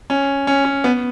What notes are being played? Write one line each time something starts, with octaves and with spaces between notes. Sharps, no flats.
C#4
C#4
C#4
B3